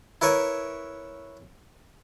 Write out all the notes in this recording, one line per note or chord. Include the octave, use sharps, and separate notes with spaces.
E4 A#4 B4 C#5 E5